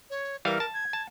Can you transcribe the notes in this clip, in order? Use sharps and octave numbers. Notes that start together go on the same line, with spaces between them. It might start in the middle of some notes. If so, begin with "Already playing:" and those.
C#5
E3 G3 A#4 F5
A5
G#6
A5